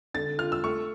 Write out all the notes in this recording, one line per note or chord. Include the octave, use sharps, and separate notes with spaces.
D3 A6
F4 F6
E6
A3 C#6